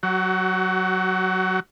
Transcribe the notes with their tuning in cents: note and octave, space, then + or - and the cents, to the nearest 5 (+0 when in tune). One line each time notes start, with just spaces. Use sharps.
F#3 +5 F#4 +35